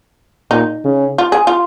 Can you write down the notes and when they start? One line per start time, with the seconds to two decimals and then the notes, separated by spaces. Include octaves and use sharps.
0.51 A#2 D#4
0.85 C#3
1.18 F4
1.32 G#4
1.47 F4